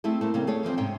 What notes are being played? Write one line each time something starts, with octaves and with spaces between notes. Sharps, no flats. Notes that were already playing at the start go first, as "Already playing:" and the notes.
A3 C4 E4 G#4 A4
A3 A#3 C4
C#3 G3 A#3 C4 C#4
A3 G#4 A4 C#5
E3 F3 A#3 C4
G#2 C3 C#4 D#4 C#5 G5